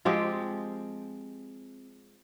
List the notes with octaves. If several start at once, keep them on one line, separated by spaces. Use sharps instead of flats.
F3 G#3 C4 G4